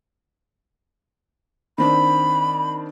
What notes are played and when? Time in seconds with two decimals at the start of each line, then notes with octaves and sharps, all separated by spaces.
1.78 D#3 C4 D4 B5